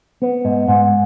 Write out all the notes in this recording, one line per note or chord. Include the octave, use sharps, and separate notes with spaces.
B3
G#2
G#2